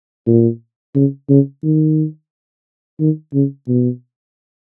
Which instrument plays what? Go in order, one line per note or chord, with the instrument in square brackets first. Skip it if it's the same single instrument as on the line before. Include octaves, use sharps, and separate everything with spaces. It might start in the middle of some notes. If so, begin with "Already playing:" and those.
[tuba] A#2
C#3
C#3
D#3
D#3
C#3
B2